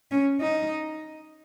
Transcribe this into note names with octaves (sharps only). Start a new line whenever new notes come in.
C#4
D#4